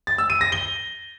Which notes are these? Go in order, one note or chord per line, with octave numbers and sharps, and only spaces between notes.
A6
E6
D#7
A#6
G7